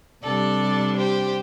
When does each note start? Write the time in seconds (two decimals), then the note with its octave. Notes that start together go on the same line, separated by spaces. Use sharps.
0.23 C3 G3 D4 A4 D5
0.97 G4 C5